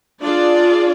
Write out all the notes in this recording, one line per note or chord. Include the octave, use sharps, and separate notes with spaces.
D4 F4 G#4 D5